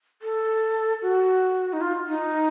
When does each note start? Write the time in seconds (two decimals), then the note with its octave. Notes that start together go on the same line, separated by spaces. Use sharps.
0.22 A4
1.02 F#4
1.73 D#4
1.81 F4
2.08 D#4